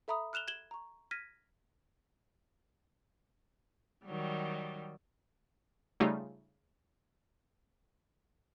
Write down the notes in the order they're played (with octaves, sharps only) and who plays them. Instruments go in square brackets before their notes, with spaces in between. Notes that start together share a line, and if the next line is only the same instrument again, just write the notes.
[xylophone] A4 E5 A#5 B5 D#6
F6 F#6 E7 F7 G7
G#6 E7 F#7 G7
A#5 C#6
F6 G#6 A#6 B6 D#7
[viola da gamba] D#3 F#3 G3
[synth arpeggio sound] C#3 G3 A3 D#4 F4